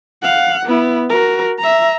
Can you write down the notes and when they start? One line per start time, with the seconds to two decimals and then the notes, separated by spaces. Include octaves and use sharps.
0.22 F5 F#5
0.66 B3 E4
1.10 F#4 A#4
1.59 E5 A#5